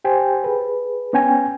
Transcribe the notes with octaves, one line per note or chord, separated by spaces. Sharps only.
G4 C5 G5 G#5
G#4 B4
B3 C#4 G5 G#5